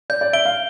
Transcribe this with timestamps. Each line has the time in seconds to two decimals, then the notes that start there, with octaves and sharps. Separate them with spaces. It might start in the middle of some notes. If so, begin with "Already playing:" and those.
0.10 D5 G6
0.21 D5
0.33 E5 D7 G7
0.45 F5